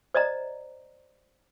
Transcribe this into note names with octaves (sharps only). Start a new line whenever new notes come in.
C5 D5 D#5 A#5